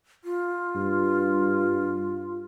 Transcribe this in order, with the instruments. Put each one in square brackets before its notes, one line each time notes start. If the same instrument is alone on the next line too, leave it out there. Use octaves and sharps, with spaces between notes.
[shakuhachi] F4
[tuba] G2